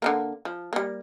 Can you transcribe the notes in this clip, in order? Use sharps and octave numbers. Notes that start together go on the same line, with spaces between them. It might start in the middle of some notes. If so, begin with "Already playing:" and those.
D3 G#3 A#3
F3
G3 A#3